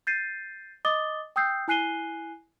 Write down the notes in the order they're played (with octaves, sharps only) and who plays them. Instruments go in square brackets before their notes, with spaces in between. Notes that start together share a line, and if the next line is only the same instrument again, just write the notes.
[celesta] G6 A6 C7 D#7
D#5 D6 D#6 A6 G7
G5 D#6 E6 G6 C7
E4 G#5 F#6 C7 D#7 G7